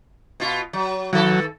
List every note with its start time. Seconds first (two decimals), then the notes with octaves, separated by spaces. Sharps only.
0.40 B2 F4
0.73 F#3
1.13 D#3 F#3 A4